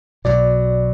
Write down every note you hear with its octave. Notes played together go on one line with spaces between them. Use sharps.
B1 B2 F#3 D5